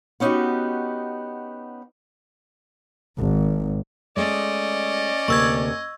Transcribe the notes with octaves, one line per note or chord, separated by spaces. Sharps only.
B3 C#4 D#4 F#4 G4
G#1
G#3 A3 C#4 D5 D#5
D2 C3 A#3 C#6 E6 G#6